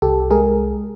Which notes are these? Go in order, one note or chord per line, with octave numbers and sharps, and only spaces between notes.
C2 G4 A4
G#3 G#4 A#4